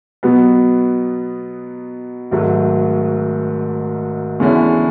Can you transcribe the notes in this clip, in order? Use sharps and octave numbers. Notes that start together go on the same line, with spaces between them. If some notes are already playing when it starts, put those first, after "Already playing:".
B2 F#3 B3
G#1 G#2 F#3 A3
E2 D3 G#3 C#4 E4